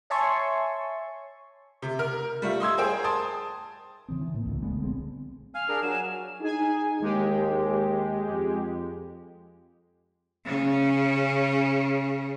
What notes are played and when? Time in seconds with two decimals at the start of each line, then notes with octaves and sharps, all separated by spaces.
0.10 C#5 E5 G#5 A5 C6 C#6
1.82 C3
1.99 A#4 F6
2.42 G3 A3 F4
2.60 D#5 C6 E6 G#6
2.78 G#4 A#4 C5 G5
3.04 A5 C6 D#6
4.08 C#3 E3 C4
4.21 E3
4.34 A2 A#3
4.46 C#2 A2 D3
4.63 D3 G#3 A3 B3
4.80 A#1 G#3 C4
5.55 F5 G#5 F6
5.69 D4 G#4 A#4
5.83 F#3 G#5 E7
6.41 D#4 G#4 G#5
7.02 D#2 G#3 G4
8.30 F2
10.45 C#3 C#4